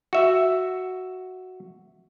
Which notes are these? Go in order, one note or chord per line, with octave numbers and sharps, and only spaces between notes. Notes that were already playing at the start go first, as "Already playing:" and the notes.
F#4 E5